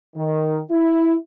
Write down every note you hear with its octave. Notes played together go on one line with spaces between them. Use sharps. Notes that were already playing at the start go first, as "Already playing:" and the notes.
D#3
E4